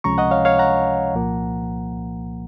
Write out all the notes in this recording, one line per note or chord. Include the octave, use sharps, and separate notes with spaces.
C#2 C3 F3 G#3 C#4 A#5 C#6
D#5 F#5
C#5 F5
C#5 F5
F#5 A#5
C2 A#2 F3 A#3